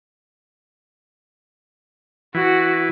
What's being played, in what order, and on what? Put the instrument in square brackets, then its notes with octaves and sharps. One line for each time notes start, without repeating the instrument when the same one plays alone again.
[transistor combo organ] E3 [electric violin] F#4